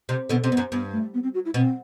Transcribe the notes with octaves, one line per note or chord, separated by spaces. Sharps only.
C3
B2 D3 B3
C3 C4
G2 B3
F#2
G2 B3
A3
B3
C4
F#4
E4
B2 C4